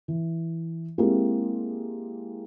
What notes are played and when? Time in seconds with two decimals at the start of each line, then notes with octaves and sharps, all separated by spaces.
0.08 E3
0.98 G#3 A#3 C4 E4 G4 A#4